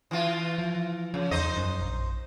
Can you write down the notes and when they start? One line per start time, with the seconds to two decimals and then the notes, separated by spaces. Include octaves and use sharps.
0.11 E3 F4
0.58 F3
1.14 C#3 F3
1.31 E2 D#4 C5 D#5
1.57 F#2
1.81 A#1